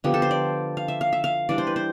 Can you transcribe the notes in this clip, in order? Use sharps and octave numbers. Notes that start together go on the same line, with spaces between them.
D3 F3 B3 G4
A4
C5
D5
F5
E5
F5
E5
F5
E3 G3 D4 D5
C5
B4
C5